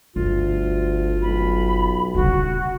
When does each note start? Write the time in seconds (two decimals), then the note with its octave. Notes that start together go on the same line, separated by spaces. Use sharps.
0.16 G1 D2 F4
1.22 B1 B5
2.14 D#1 C#3 F#4